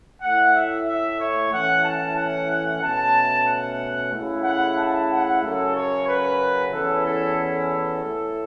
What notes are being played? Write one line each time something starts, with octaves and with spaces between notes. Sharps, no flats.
A2 A3 E4 F#5
E5
E5
C#5
A2 E3 C#4 F#5
A5
F#5
F#5
B2 A3 C#4 A5
F#5
C#3 A3 E4
F#5
A5
F#5
F#2 C#3 F#3 C#4 A4
C#5
B4
E2 E3 C#4 E4 A4
A4
A4
A2 A3 E4